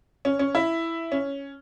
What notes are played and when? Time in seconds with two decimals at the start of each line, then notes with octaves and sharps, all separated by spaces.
0.25 C#4
0.39 C#4
0.55 E4
1.12 C#4